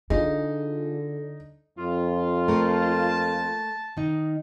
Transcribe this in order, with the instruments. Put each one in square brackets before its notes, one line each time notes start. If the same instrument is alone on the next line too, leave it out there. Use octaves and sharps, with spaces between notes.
[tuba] D3 [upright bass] D4 [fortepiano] D#4 [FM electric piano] F4 G#4
[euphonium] F2 [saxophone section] F4
[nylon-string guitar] A3 A#3 A#4 [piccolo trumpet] A5
[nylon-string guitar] D#3 D#4